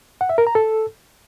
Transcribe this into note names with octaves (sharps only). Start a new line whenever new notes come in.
F#5
E5
A#4
A#5
A4